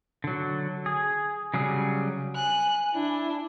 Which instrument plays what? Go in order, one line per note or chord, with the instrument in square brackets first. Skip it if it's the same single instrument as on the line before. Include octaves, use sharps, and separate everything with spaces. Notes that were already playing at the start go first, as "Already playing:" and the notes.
[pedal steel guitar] D3 F#3
G#4
C#3 F#3 G3 G#4
[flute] G#5 [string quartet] F#6
[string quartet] D4 [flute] E4